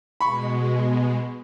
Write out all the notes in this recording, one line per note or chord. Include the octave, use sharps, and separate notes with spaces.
B2 G#3 B5 C#6